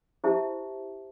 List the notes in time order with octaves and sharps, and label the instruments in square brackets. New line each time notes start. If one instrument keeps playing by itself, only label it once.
[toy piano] E4 G4 C5 E5 A5